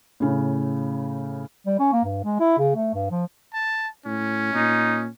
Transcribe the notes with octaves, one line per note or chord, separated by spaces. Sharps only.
A2 C#3
G3
C#4
A#3
G2
G#3
E4
C#3
A3
G2
F3
A5
A2 C#4
A#2 D#4